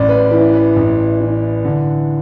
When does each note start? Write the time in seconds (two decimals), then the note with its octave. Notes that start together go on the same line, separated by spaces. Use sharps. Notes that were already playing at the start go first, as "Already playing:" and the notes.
Already playing: A1 D5
0.09 B4
0.31 E3 B4
0.53 B4
0.76 A1
1.20 E3
1.65 D3